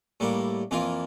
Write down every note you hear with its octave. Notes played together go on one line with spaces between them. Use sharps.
A2 G3 A#3 E4
F2 E3 A#3 F4 A#4